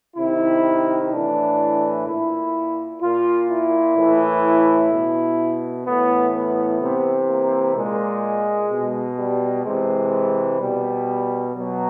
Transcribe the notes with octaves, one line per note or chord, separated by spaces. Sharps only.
C3 D#3 E4
A2 E3 D4
A#2 E4
A#2 F4
E4
A2 E3
E4
B2
A2 E3 B3
B3
C3 E3
A#3
A#2 G#3
B2
G3
C3 E3 G#3
B2 G3
B2 F#3